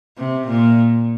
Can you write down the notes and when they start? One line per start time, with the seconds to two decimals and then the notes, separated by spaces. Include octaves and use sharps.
0.18 C3
0.48 A#2